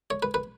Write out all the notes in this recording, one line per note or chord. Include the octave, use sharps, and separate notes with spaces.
C#5
B4
B4